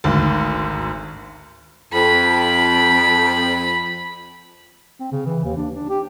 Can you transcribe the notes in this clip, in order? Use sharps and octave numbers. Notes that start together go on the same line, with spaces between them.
G#1 D2 G#2
F2 B5
C4
C#3
E3
D#2
D4
D4
G4